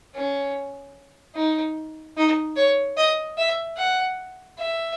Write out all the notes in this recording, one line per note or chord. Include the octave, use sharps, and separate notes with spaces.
C#4
D#4
D#4
C#5
D#5
E5
F#5
E5